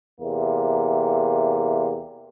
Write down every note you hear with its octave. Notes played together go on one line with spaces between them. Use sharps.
E2 C3 A#3